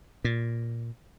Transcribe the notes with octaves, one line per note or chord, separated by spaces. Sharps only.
A#2